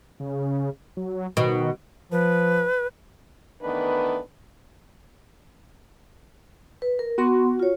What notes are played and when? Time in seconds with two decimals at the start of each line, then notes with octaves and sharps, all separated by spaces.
0.20 C#3
0.97 F#3
1.37 B2 D#3
2.12 F3 B4
3.61 D#3 E3 A3 B3 D4 B4
6.82 B4
6.99 A#4
7.18 B3 F#4 C6
7.59 F4 C#5